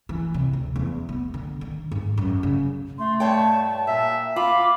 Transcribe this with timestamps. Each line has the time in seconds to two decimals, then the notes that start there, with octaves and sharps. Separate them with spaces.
0.09 E3
0.34 C3
0.53 D2
0.76 E2
1.09 B3
1.34 D3
1.61 D#3
1.91 G#2
2.18 F#2
2.43 C#3
2.99 A3 C6
3.20 G2 C#5 G5 A5
3.87 A#2 E5
4.36 F4 B5 D6